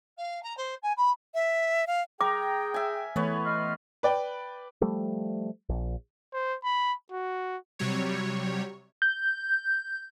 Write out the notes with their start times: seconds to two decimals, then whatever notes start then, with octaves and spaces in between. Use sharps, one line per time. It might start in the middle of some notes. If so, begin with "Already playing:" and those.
0.17 F5
0.42 A#5
0.57 C5
0.82 G#5
0.96 B5
1.34 E5
1.87 F5
2.21 G#4 A#4 G5 D6
2.74 E5 G#5
3.16 E3 A3 B3 B4 C#5
3.45 D#5 C6 F6
4.03 B4 D5 G5
4.81 F3 G3 A3
5.69 A#1
6.33 C5
6.64 B5
7.12 F#4
7.79 C3 F#3 G3 C#5
9.02 G6